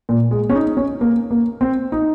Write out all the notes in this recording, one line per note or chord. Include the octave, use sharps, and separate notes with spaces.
A#2
G#3
C#4
D#4
C#4
A#3
A#3
C4
D#4